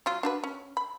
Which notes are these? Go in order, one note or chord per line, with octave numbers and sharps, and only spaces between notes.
F#3 F4
D4 F#4 B4
C#4
B5